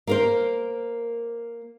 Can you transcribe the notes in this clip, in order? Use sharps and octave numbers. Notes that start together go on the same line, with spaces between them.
A#3 A#4 C5